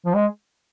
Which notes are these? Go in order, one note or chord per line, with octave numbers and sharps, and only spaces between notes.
F3
G#3